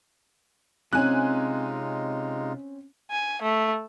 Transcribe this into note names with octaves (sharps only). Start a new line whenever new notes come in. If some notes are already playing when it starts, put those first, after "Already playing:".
C3 G#3 C4 C#4 D#4 F4 G#5 F#6
G#5
A3